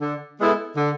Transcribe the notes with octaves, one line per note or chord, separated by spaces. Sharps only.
D3
G#3 B3 E4 A4
D3